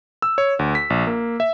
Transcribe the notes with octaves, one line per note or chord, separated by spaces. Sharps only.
E6
C#5
D2
B6
A#1
A#3
E5